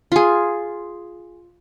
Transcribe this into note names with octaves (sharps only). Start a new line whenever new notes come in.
F4 G#4